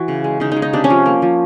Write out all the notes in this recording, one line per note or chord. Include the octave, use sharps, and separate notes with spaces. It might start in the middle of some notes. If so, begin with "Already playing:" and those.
Already playing: E3 F#4
C#3
G#3
C#3 D#4
G#3 D#4
D#4
C3 D4
C#4
F3
A#3
F3